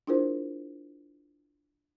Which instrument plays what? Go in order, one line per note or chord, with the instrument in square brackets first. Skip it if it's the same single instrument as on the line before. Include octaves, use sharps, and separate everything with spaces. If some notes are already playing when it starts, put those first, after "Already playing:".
[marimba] D4 E4 F4 G#4 A#4 C5